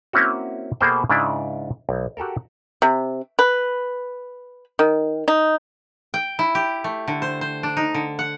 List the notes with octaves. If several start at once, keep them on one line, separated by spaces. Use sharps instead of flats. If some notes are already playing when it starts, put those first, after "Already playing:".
A#3 C4 C#4 E4 F#4
B2 A#3 G#4 A4 C5 G5
G#2 C#3 D4 E4 D5
B1
F#4 G4 A4 A#4
C3
B4
D#3
D#4
G5
E4
G4
A3
D3
C5
C5
D4
D#4
D3
F#5